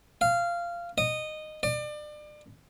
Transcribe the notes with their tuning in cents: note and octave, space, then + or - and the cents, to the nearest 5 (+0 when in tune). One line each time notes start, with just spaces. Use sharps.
F5 -15
D#5 -15
D5 +35